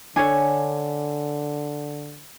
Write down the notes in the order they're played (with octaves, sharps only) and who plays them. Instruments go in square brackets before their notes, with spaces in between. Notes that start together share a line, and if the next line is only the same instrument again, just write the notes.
[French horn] D3 [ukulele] D4 A4 C#5 [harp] G#5